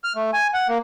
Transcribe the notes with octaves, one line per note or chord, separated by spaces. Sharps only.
F6
A3
G#5
F#5
A#3